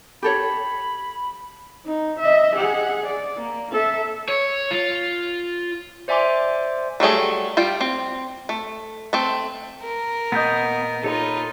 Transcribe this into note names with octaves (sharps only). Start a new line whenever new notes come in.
G4 A4 C#5 B5
D#4
D#5 E5
G#4 F#5
D5
A#3
A4 E5
C#5
F4
C5 D5 E5 G#5 C6 D6
F#3 G3 A3 G#4
G3 F4 G5
C4
A3
A3 C4
A#4
A#2 B3 D#5 G6
D#4 F4 A4 C#5 B5